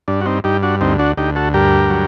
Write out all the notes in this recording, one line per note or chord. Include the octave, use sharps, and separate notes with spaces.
G2 D4
F#4
C4 D#4
G2 D#4 G4
D4 F#4
D2 C4 D#4
D4 F#4
D2 D#4 G4
F#4 A4
G2 G4 A#4
F#3